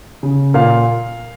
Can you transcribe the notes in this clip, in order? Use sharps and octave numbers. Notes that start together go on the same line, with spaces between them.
C#3
A#2 F5